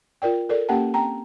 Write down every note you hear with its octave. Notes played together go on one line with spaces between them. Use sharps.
F4 A#4 D5 G5
A4 A#4 D5
A#3 C#4 G4 F#5 G5 A5
C4 G5 A#5